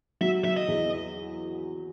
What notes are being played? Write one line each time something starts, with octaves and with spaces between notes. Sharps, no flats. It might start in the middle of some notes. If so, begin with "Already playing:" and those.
F#3 E5
F#3 E5
D#5
E2